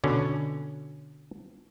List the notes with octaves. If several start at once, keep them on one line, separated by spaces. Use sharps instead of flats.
B2 D3 C#4